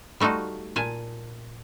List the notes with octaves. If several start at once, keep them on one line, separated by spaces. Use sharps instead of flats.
G3 A3 D#4 F4 F#4
A#2 G#5 A5